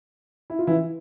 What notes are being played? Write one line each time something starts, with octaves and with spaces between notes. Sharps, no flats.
E4
F4
E3 E4